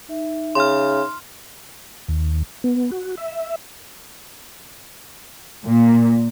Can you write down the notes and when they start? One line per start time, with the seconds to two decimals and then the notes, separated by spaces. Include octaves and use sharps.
0.09 D#4 E5
0.55 C#3 C6 F6
2.08 D#2
2.64 B3
2.91 F#4
3.17 E5
5.66 A#2